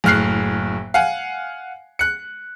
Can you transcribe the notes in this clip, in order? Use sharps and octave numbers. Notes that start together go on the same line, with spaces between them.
F#1 A2 F6 F#6 C7
F5 F#5 G#5
F#6 C#7